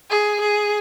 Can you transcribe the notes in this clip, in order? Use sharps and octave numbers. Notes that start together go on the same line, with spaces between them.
G#4
G#4